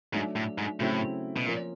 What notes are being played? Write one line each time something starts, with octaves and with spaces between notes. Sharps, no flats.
G#2 F#3 A3 D4
A2
G#2
A2 C#3 F#3 A3 C4 E4
B2
A#2 F3 A#3 C#4